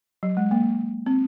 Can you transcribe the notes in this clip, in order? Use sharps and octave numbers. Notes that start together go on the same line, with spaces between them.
F#3
G#3
A#3
C4